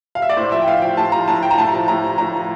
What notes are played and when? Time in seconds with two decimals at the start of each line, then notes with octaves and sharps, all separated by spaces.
0.15 F5
0.22 E5
0.29 D5
0.37 A2 C5
0.52 F3 E5
0.62 G5
0.67 A2 F5
0.82 F3 G5
0.97 A2 A5
1.12 F3 A#5
1.28 A2 A5
1.43 F3 G5
1.51 A#5
1.58 A2 A5
1.73 F3
1.88 A2 A#5
2.03 F3
2.18 A2 A#5
2.34 F3